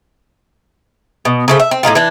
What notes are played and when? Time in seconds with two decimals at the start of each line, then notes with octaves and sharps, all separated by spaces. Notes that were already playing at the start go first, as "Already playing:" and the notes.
1.25 B2
1.48 C#3 A3 C5
1.60 E5
1.71 C4
1.83 A2 C3 D#4 F4
1.95 E3 D4